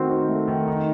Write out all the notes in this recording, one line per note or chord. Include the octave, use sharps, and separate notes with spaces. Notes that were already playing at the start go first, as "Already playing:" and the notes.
Already playing: D#3 A3 C4 F#4
D#4
A3
D#3
D#4